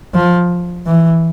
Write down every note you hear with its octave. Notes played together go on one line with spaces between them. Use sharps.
F3
E3